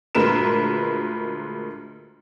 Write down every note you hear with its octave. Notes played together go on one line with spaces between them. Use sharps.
D2 A#2 G#3 A#4 B4 E7